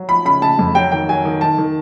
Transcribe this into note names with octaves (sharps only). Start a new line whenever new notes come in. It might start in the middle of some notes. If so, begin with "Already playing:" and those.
Already playing: F#3
F3 B5
C#3 B5
C#3 A5
F2
F#3 G5
D#3 G5
F#3 G#5
D#3
D#3 A5
D#3